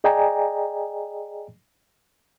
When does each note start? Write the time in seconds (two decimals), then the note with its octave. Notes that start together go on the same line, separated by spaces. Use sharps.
0.04 G#4 D5 D#5 G5 G#5 A#5